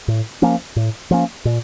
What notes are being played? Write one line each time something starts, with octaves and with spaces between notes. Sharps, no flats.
A2
F3 A#3 C#4
A2
F3 A#3 C#4
A#2